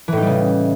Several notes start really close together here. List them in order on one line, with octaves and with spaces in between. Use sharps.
E3 A2 D#4 G3 C#3